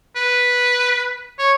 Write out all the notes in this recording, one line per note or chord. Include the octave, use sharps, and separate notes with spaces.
B4
C#5